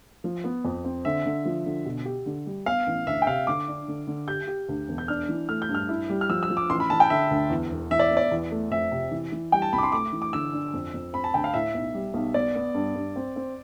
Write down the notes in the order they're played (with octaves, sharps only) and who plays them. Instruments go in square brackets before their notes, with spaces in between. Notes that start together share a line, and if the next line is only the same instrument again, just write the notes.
[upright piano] F3
B3
F2
C4
[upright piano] D3 [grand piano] E5
[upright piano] D3
F3
D3
B2
G4
D3
G3
[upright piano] B3 [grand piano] F5
[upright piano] A1
[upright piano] D2 [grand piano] E5
[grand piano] G5
[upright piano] C3 [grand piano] F5
[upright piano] D3 [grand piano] D6
[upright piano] D4
D3
D3
[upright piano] G4 [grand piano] G6
[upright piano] G4
D2
E1
[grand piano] G6
[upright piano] D4 [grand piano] F6
[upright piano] E3
[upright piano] A3 [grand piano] F6
[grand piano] G6
[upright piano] G2
[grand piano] F6
[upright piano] E4
G3
[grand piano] F6
[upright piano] F3 [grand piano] E6
[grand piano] E6
[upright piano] F3
[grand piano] D6
[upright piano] A1 [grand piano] C6
[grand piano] B5
[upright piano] A1 [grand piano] A5
[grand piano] G5
[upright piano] D3 [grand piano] E5
[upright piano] D2
E2
E1
[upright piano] E3 [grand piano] E5
[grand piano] D5
[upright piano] B3
[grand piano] D5
[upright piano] E2
A3
[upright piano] F2 [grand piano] E5
[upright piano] C3
E3
E3
[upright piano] G3 [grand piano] G5
[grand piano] A5
[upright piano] C2 [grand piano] B5
[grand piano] D6
C6
[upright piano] A3 [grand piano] D6
[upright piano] E3
[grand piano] D6
[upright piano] D3 [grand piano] E6
[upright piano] D4
F2
F2
[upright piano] C4 [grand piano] B5
[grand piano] A5
[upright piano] D2 [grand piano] G5
[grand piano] F5
[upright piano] A2 [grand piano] E5
[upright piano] B1
G3
B1
[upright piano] B3 [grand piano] D5
[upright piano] B3
G2
G2
C4
C4